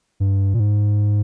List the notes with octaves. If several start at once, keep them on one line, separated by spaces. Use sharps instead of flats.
G2
A#2
G#2